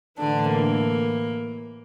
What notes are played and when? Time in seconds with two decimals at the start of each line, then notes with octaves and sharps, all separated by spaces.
0.18 A2 D3 E3 D4
0.49 A#3